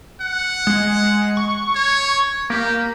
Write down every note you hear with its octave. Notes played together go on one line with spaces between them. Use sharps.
F#5
G#3
C#6
C#5
A#3 G4